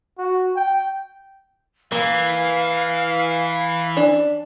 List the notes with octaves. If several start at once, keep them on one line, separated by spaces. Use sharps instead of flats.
F#4
G5
E3 A#3 F5
D4